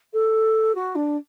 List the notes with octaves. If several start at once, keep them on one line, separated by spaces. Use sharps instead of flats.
A4
F#4
D4